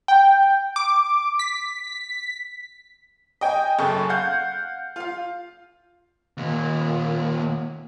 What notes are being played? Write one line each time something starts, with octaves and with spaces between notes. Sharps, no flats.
G5
D6
B6
D#5 G5 G#5
F#1 F#2 G#4 A4 C#6
F5 F#5 G6
F4 F5
D#2 A#2